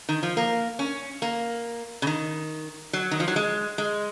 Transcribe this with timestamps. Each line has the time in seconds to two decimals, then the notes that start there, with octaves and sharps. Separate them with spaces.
0.09 D#3
0.23 F3
0.37 A#3
0.79 C#4
1.22 A#3
2.02 C#3
2.07 D#3
2.93 F#3
3.11 D#3
3.20 F3
3.28 F#3
3.36 G#3
3.78 G#3